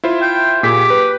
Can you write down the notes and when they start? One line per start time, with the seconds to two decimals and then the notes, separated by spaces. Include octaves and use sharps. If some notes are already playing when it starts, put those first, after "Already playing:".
0.04 E4 F4 C5
0.22 G5
0.63 A#2 G4 G#4 B6
0.90 B4